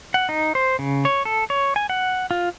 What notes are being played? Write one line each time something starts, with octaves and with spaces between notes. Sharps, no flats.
F#5
D#4
C5
C#3
C#5
A4
C#5
G#5
F#5
F4